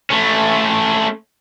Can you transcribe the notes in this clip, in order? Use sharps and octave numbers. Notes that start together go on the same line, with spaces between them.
A3 C#4